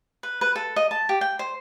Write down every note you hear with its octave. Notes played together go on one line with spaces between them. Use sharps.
B4
B4
A4
D#5
A5
G4
G5
C5